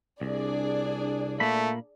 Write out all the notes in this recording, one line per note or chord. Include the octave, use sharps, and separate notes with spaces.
C2 D4 G#4 D5
A#2 A3 A#3 B5